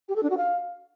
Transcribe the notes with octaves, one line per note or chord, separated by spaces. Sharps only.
G4
A4
D4
F#4
F5